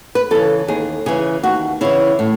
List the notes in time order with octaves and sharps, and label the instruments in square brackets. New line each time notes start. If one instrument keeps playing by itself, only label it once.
[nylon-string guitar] B4
C#3 E3 A4
D#2 G#4
C#3 E3 G#4
D#2 F#4
C#3 E3 E4
A2